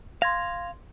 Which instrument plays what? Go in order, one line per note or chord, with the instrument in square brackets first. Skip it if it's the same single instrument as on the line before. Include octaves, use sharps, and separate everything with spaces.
[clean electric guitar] F5 [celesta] C6 G#6 A#6